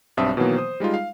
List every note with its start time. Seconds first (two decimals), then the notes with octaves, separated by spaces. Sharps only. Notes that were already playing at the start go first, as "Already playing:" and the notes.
0.17 B1 G2 C4 E5 A5 D#6
0.37 B2 D#3 E3 F#3 A#3 B3
0.56 C5 D#6
0.80 G3 G#3 D#4 F4
0.94 F5